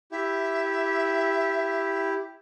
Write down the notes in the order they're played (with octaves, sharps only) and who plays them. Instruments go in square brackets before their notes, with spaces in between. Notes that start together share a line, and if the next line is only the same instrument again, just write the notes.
[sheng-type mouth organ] E4 G4 [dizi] E5